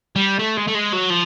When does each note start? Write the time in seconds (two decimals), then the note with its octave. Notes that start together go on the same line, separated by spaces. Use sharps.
0.16 G3
0.39 A3
0.57 G#3
0.67 A3
0.74 G#3
0.92 F#3
1.10 F3